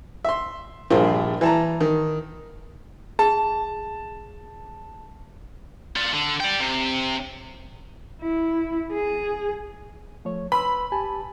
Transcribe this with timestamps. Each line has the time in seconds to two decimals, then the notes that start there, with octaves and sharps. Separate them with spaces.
0.25 E5 C6
0.90 A#1 G2 F4 G#4 A#4 C5
1.41 E3 A5 A#5
1.81 D#3
3.19 G#4 A5
5.96 F4 D5
6.13 D3
6.40 D5 G5
6.60 C3
8.21 E4
8.93 G#4
10.25 F3 A3 C#5
10.52 B4 B5 C6 E6
10.92 G4 G#5 A5